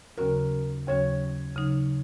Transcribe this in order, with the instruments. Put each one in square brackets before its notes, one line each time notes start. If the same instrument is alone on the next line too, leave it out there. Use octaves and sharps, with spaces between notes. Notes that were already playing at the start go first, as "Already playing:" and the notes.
[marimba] D#2 C#3 F#3 C#4 F#4 [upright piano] A#4
[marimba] D#2 C#3 F#3 C#4 F#4 [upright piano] C#5
[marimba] C#3 F#3 D#4